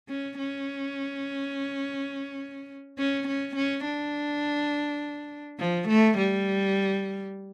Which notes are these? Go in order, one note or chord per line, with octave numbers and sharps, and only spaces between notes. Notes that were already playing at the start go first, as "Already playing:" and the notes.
C#4
C#4
C#4
C#4
C#4
D4
F3
A3
G3